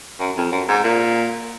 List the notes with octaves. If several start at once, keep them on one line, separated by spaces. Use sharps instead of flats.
F#2
F2
F#2
G#2
A#2